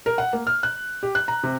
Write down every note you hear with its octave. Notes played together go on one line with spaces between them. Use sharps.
A#4
F#5
A#3
F6
F#6
G4
F#6
A#5
C3